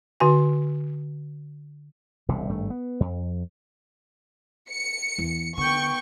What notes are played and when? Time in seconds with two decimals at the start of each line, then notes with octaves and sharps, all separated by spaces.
0.20 D3 F#4 G#5
2.28 E1 C2 C3
2.49 G#1 G2 A3
2.70 B3
3.00 F2
4.70 C#7
5.18 E2
5.57 D3 B3 G5 C#6